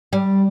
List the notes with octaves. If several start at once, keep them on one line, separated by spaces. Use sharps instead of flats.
G3